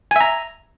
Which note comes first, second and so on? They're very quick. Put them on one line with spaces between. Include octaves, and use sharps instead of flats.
G#5 E5 A#5